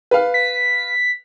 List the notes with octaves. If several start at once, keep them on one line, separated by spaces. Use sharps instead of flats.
B4 F5
B6